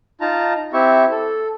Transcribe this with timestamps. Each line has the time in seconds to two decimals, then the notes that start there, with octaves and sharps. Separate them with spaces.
0.21 D#4 F4 A5 A#5
0.73 C4 E4 G4 E5 C#6
1.11 A4